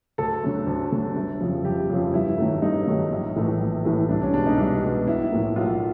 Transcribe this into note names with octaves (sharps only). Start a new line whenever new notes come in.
D2 A4
D3 F#3 A3
D2
D3 F#3 A3
G1
F2 C#3 F3
G1 G4
F2 C#3 F3
G2 E4
D#3 F#3 A3
G2 D#4
D#3 F#3 A3
A#1
A2 E3 A3
A#1
A2 E3 A3
C2 D4
C#4
B2 G#3 D4
D#4
C2
B2 G#3
B1 E4
A2 F3 A#3
B1 F4